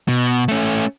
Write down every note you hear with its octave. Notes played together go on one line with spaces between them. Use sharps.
B2
A3 C#4